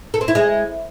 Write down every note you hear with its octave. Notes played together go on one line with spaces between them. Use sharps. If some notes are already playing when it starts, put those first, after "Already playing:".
A4
C4
E4
G#3